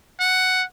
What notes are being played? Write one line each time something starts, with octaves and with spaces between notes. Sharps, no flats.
F#5